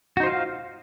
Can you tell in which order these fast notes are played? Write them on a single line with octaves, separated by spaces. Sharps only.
F#4 D#4 C5 F4 F5